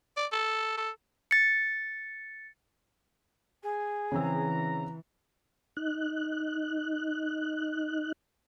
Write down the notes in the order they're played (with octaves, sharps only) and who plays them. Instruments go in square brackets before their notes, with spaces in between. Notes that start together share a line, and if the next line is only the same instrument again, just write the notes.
[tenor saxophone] D5
A4
A4
[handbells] A6 C#7
[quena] G#4
[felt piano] C#3 C4 E6 [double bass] E3 [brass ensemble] A#5
[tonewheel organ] D#4 F#6